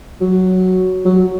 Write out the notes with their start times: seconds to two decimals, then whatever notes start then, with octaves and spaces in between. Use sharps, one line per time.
0.21 F#3
1.05 F#3